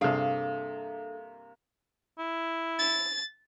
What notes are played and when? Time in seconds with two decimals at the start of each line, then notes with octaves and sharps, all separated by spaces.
0.01 G2 C3 A#3 D4 G#4 A4 F5
2.18 E4
2.79 A6